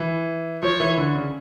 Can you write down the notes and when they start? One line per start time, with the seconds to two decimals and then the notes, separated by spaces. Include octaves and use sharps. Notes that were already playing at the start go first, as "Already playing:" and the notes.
Already playing: E3
0.63 F3 C#5
0.80 E3
0.98 D3
1.15 C#3